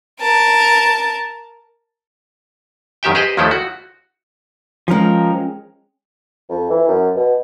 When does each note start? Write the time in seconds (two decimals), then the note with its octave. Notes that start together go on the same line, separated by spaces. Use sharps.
0.20 A#4 A5
3.03 F#2 D#3 G4 E5 G5
3.15 G4 G#4 B4 C5 D#5
3.37 D#2 D#3 F3 A3 E4 A4
3.51 F#4
4.88 F3 G#3 C#4 A#4 G5
6.49 F2
6.70 E3
6.88 F#2
7.16 B2